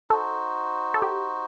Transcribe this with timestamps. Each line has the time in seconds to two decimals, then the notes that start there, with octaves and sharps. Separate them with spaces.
0.10 D#4 F#4 A4 C5
0.94 A4
1.02 G4